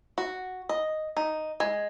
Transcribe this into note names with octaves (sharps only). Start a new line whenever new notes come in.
F#4
D#5
D#4
G#3